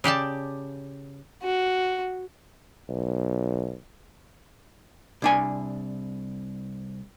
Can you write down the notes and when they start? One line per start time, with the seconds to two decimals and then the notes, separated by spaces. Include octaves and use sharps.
0.04 C#3 G4 D5 A5
1.43 F#4
2.89 B1
5.22 C2 D4 G#5